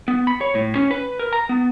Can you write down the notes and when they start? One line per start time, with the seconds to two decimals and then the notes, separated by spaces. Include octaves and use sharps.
0.08 B3
0.27 B5
0.41 C#5
0.55 A2
0.75 C#4
0.91 B4
1.19 A#4
1.33 A#5
1.49 B3